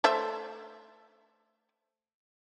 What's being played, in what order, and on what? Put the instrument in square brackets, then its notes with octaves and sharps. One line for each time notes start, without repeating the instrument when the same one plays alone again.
[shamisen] A3 C5 E5